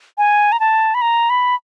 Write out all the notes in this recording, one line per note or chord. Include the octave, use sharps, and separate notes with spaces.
G#5
A#5
A5
B5
A#5
B5